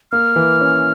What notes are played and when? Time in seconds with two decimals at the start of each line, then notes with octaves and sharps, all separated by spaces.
0.12 A#3 F6
0.36 E3
0.61 C#4